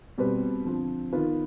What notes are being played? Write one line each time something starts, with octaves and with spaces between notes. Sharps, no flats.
B2 G3 C4 G4 B4
D3 F3 C4
D#3 B3 F4 B4